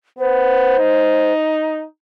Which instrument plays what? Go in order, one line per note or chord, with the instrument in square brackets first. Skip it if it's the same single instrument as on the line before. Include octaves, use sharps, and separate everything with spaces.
[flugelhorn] B3 [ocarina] C5
[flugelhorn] D#4